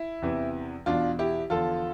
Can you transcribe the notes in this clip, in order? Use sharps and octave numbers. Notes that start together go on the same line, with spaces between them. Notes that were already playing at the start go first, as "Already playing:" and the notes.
Already playing: E4
E2 C3 E3
E2 B2 D4 F4
E4 G4
E2 D3 F3 F4 A4